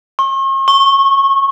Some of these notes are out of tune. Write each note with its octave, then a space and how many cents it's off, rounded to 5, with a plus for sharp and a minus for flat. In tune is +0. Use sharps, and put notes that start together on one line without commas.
C#6 -45
C#6 -20